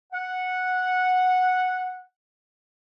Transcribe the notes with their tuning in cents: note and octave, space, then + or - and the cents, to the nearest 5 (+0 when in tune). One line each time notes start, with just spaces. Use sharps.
F#5 -10